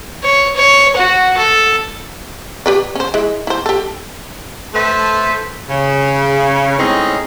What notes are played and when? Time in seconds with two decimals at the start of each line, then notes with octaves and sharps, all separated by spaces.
0.24 C#5
0.56 C#5
0.97 F#4
1.38 A4
2.66 G4 B4 D5
2.95 C#4 C5
3.14 G#3 E4
3.47 E4 C5
3.66 G4 A4
4.74 A3 A4 B4 C5 E5
5.69 C#3
6.79 A2 G#3 C4 C#4 D#4